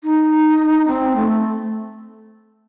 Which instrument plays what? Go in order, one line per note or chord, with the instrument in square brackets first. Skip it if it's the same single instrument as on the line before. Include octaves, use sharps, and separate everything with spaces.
[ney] D#4
C4
A3